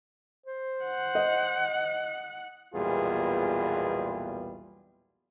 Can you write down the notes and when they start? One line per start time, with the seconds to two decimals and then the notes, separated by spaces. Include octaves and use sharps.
0.46 C5
0.85 F#5
1.15 D#5
2.74 B1 E2 A#2 G3 F4 G#4